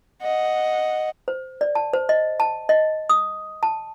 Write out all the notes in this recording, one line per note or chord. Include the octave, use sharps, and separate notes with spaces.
D#5 F#5
C5
D5
A5
C5
D#5
A5
D#5
D#6
A5